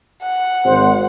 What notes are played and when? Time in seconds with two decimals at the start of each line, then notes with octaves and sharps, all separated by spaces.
0.23 F#5
0.65 G#1 C5